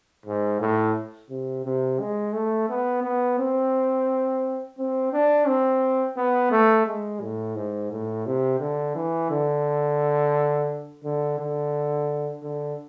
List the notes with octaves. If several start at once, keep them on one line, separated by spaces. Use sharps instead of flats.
G#2
A2
C3
C3
G#3
A3
B3
B3
C4
C4
D4
C4
B3
A3
G#3
A2
G#2
A2
C3
D3
E3
D3
D3
D3
D3